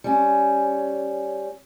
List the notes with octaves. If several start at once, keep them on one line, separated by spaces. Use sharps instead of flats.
G3 C#4